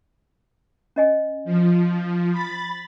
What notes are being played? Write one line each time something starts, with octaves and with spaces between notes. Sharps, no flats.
C#4 D#5 G#5
F3
B5 A6